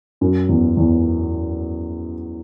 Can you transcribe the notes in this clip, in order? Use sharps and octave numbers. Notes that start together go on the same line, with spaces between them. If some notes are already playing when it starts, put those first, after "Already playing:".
F#2
E2
E2